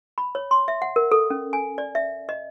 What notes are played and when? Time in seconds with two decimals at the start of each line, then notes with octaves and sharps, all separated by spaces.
0.18 B5
0.35 C#5
0.51 C6
0.68 E5
0.82 F#5
0.96 A#4
1.12 A4
1.30 C#4
1.53 G#5
1.78 D5
1.95 E5
2.29 D#5